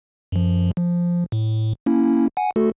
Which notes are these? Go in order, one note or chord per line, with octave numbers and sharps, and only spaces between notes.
F#2 F3
F3
A2
A#3 C#4 E4
F#5 G#5
A3 F#4 A4